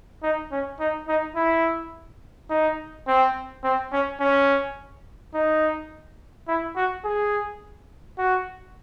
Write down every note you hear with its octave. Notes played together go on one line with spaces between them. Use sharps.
D#4
C#4
D#4
D#4
E4
D#4
C4
C4
C#4
C#4
D#4
E4
F#4
G#4
F#4